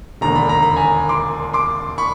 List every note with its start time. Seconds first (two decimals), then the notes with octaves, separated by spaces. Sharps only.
0.21 E1 D#2 D3 A#5
0.35 B5
0.49 A#5
0.63 B5
0.77 G#5 A#5
1.09 C6 D6
1.53 C6 D6
1.98 B5 C#6